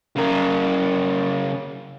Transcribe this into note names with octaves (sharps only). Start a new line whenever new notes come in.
C#3 A#4